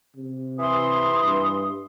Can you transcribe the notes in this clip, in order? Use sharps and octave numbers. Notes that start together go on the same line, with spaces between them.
C3
E3 C6 D#6
G2